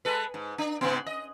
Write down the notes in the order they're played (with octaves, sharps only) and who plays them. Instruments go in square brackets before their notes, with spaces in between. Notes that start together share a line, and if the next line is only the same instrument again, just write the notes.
[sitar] G#3 A4 B4
G#2
D4
G#2 C#3 B3
D#5